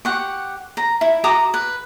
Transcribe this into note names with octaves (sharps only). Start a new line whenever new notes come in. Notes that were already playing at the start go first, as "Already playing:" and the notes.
G4 F#5 C#6
A#5
E4
F#4 A#5 D6 D#6
B4